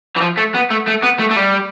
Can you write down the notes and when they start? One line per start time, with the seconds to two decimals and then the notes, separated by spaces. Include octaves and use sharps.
0.17 E3
0.21 F3
0.38 A3
0.55 B3
0.71 A3
0.88 A3
1.03 B3
1.19 A3
1.31 A3
1.37 G3